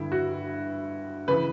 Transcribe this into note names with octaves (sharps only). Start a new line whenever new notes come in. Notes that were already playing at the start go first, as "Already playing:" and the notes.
Already playing: G2 D3 E4
F#4
C#3 E3 B4